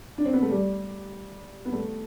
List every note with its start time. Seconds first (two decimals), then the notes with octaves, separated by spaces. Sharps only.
0.18 D4
0.25 C4
0.33 B3
0.42 A3
0.50 G3
1.65 B3
1.72 A3